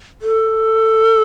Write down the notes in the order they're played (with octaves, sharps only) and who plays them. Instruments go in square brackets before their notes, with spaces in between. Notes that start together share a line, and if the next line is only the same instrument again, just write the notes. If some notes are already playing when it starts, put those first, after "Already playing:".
[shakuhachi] A4